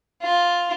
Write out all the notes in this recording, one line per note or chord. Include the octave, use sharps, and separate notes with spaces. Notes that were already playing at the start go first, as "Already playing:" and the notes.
F4